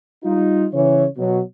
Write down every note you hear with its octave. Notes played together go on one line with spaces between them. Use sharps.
G3 D#4 F4
C#3 E3 C#5
B2 F#3